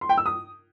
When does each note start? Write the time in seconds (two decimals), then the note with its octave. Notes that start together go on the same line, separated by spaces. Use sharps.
0.01 C6
0.09 G5
0.17 E6
0.26 D#6